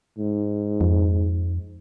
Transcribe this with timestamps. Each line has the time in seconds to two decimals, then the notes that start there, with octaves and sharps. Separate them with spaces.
0.18 G#2
0.81 F2